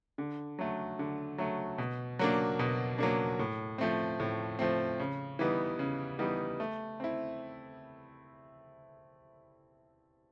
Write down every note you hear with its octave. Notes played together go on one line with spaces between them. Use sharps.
D3
F#3 A3
D3
F#3 A3
B2
F#3 A#3 D4
B2
F#3 A#3 D4
A2
F3 A3 C4
A2
F3 A3 C4
C#3
E3 G3 B3 D#4
C#3
E3 G3 B3 D#4
A3
C4 E4